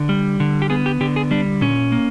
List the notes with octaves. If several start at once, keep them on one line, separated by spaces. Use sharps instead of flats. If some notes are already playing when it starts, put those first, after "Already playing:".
Already playing: D3
G3
D3
G4
B3 G#4
G4
D3 G4
G#4
G3 D4
A#2 C#4
A#3